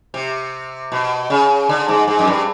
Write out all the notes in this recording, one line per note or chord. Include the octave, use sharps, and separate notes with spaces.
C3
B2
C#3
D3
G#2
G#2
F#2
G2